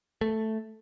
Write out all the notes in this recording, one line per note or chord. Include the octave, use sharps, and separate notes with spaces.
A3